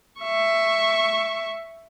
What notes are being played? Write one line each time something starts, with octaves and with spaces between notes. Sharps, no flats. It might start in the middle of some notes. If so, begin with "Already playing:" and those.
E5 C#6